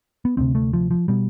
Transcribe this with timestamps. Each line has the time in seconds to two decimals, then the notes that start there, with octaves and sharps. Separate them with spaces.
0.25 B3
0.37 D2 C3 C4
0.55 A3
0.73 F3
0.91 F3
1.08 B2 G3